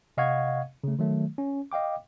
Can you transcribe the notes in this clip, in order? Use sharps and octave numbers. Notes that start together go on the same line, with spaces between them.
C3 D#5 F5 F#5 C#6 G#6
C#3 A3
D#3 F#3 A3
C#4
D#5 F5 G5 D6